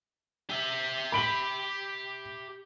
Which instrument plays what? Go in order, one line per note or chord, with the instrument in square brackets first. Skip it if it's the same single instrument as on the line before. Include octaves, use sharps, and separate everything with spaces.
[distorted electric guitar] G4 E5
[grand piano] B5 D7 F#7